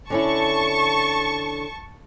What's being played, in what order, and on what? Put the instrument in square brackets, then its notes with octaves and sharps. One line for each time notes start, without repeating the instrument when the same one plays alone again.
[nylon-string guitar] D3 C#4 E4 [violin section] A5 C#6